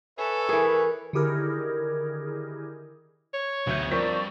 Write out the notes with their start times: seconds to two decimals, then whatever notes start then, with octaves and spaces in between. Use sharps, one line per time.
0.18 A4 B4 C#5 E5 G#5
0.49 E3 G#4 A#4
1.13 D3 D#3 E4 G4 G#4 A#4
3.33 C#5
3.67 D2 F#3 B3 E5 G6
3.91 G2 F3 C4 A#4 D5 C#6 B6